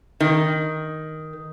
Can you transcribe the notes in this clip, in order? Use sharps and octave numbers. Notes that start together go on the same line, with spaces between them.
D#3